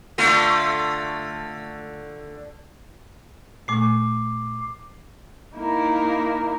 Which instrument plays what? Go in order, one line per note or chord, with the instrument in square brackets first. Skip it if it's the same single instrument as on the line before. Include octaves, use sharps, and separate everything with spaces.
[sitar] D3 A3 F4
[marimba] A#2 A3 C#6 [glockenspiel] D6 C7
[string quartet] A#3 D#4 E4 A#4